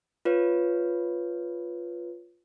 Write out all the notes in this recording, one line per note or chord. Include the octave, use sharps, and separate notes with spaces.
F4 B4 C#5